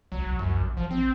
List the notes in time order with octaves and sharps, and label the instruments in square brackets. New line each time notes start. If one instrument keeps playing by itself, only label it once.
[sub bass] C2 [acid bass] F#3
[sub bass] B1
[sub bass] C#2 [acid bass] F#2
[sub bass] A#1
[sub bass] A1 [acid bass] F3
[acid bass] C4